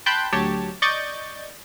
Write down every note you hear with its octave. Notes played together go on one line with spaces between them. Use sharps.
G5 A5 B5 C6 F#6 G6
D2 F#3 G4 C#5 A5
D5 D#5 C#6 G6 A6